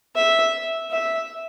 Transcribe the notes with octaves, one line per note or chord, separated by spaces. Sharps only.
E5
E5